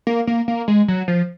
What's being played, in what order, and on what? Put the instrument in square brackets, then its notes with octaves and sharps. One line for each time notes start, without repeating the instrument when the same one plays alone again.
[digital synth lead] A#3
A#3
A#3
G#3
F#3
F3